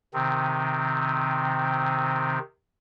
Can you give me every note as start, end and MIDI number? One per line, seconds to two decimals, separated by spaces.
0.14 2.39 48
0.14 2.39 51
0.14 2.39 60